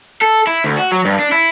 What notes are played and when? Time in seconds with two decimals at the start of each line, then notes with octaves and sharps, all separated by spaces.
0.21 A4
0.47 E4
0.64 D2
0.78 F#4
0.92 F#3
1.05 G2
1.19 D4
1.32 E4